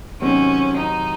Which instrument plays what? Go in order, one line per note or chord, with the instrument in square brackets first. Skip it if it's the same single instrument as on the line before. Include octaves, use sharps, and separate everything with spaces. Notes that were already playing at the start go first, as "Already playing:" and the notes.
[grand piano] C3 D#3 F#3 C4 [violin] C#4
[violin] D#4